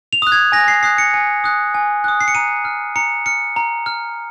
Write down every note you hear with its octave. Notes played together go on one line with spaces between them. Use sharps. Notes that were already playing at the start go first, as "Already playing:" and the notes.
F7
D#6 F#6
G#6
G#5 A#6
C7
D#6 F#6 C7
C#7
G#5
D#6 F#6
G#5
D#6 F#6
C7
C#7
A#5 D#7
F6
A#5 C#7
F6 C#7
A#5
F6